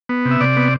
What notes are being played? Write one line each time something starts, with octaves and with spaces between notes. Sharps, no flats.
B3
C3
E5
C3 D5
B3